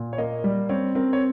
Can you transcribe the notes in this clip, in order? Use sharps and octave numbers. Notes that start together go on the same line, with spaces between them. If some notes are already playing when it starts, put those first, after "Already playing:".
Already playing: A#2
C#5
A#3 D#5
G3
C4 C#5
C4 A#4
C#5